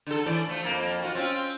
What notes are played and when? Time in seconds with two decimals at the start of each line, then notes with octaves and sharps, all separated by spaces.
0.07 D3 A4
0.26 A2 E3 D5
0.49 F3 A3
0.64 F2 A#3
1.02 F4 F#4
1.15 C4 C#4 F4